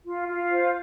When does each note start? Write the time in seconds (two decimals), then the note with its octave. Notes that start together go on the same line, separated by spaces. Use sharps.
0.05 F4
0.27 F4
0.50 C5